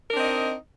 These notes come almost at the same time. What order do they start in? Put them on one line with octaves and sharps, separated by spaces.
A#4 D4 C4 D#5 D#4